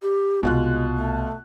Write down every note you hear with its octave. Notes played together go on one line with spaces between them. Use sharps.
G4
C2 B2 G#3 F4 F#6
A3